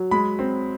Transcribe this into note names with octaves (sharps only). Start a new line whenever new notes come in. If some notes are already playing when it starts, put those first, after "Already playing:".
Already playing: F#3
G#3 B5
C4